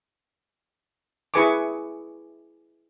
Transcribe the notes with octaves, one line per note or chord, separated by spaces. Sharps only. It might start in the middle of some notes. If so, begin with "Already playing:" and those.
E4 G#4 B4 G#5 C#6 D6